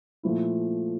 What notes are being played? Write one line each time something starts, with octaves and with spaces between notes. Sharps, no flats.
A#2 F3 A3 E4